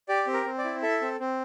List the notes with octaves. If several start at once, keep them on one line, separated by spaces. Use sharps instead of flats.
G4 D5
C4
A#4
C4
D5
E4
A4 E5
C4
C4